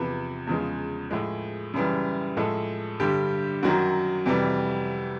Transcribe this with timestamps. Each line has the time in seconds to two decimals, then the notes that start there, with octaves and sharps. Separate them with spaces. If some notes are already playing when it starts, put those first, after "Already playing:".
Already playing: E2 C3 F3 B4
0.47 E2 C#3 F3 G#3
1.11 A2 F3 G#3
1.74 F#2 C#3 E3 G3
2.37 A2 F3 G#3 A4
2.99 G2 D3 G3 G4
3.63 F#2 D#3 F#3 F#4
4.26 F2 C3 E3 G3